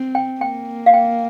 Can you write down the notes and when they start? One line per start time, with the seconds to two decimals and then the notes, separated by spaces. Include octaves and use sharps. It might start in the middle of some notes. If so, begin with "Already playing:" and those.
Already playing: C4
0.15 G5
0.41 A#3 G5
0.86 F5
0.94 G5